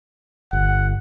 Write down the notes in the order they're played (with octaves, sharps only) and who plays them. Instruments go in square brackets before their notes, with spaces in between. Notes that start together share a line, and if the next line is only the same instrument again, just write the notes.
[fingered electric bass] G1 [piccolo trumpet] F#5